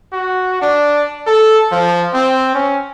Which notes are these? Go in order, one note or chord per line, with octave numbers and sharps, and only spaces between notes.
F#4
D4
A4
F3
C4
C#4